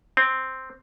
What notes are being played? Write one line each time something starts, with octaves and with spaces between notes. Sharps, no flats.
C4